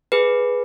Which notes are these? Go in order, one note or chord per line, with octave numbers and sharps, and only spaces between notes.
G#4 B4